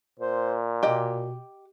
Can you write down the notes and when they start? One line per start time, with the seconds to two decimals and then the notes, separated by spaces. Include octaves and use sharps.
0.19 A#2 C5
0.83 B2 G4 D#5